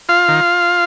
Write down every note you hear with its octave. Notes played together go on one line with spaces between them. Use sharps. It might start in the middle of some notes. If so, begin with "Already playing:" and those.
F4 F5
D#3